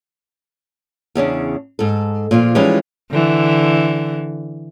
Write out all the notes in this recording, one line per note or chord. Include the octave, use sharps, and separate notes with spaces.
E2 C#3 C#4 D4
G#2 A4
A#2 F3 F4
E3 F3 G3 G#3 C#4 D#4
D3 E3